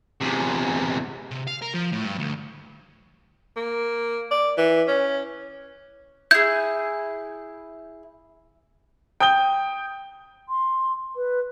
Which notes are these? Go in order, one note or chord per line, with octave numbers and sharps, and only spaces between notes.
E2 C3
C3
F5
A#4
F3
A2
G2
D2
A#3
D5
E3
C#4
E4 G#4 G6
G5 D#6 G6 G7
C6
B4